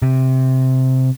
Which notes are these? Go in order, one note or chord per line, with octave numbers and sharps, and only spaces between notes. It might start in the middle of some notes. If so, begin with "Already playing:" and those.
C3